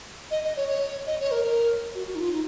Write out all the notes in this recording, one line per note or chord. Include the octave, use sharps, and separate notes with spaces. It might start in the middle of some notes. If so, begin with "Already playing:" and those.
D#5
D#5
C#5
C#5
D#5
C#5
A#4
A#4
F#4
F#4
D#4
F4
D#4